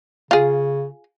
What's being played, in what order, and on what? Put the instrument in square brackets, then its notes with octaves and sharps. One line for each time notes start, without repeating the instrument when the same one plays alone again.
[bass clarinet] C#3 [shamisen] F4 G#4